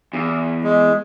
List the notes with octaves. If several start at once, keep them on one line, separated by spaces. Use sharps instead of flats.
E2
G#3